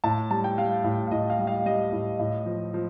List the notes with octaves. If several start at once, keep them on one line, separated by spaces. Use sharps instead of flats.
A2 A5
G3 A5
G5
G3 F5
A2
F5
A2 D#5
F5
G3
F5
G3 D#5
A2
A2
F3
F3